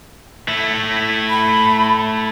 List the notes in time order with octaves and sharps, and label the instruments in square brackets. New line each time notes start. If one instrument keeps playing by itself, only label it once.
[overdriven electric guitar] A3 E4
[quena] B5